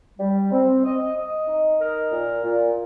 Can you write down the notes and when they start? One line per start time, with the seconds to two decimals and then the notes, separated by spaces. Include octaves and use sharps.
0.19 G3
0.52 C4
0.84 D#5
1.16 D#5
1.47 D#4
1.80 A#4
2.11 A#2
2.43 A#2